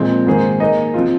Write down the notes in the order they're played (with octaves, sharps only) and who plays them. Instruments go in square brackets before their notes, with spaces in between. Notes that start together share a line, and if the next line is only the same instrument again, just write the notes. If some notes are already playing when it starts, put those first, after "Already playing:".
Already playing: [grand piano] A#2 F3 G#3 C4
G#2 D#3 A#3 G#4 C5
A#3 D#4 G#4 D#5
F3 C4 F4